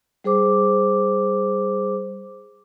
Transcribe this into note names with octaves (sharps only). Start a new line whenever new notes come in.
G3 G#4 C5 D6